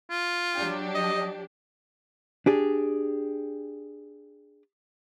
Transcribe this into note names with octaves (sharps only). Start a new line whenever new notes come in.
F4
F#3 D4 G4
D#5
D4 G4 G#4